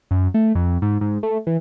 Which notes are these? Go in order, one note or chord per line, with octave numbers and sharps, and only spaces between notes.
F#2
A3
F2
G#2
G#2
A3
E3